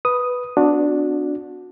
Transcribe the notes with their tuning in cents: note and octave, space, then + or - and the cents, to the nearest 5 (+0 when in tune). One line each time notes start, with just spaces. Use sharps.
B4 +0 D#6 +0
B3 +35 D4 +0 F#4 -25